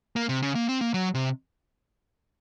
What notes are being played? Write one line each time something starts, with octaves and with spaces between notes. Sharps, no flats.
A#3
C3
C#3
A#3
C4
A#3
F#3
C3